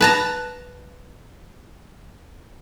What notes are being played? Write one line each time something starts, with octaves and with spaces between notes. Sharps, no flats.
B4 A5 A#5